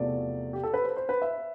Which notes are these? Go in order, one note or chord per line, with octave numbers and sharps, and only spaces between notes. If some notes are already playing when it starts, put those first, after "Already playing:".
Already playing: E2 C3 F3 A3 D5
G4
A4
B4
C5
C5
B4
E5